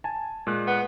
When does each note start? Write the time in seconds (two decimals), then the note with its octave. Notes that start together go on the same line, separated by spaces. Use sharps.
0.04 G#5 A5
0.47 A#2 G#3 F#6
0.67 B3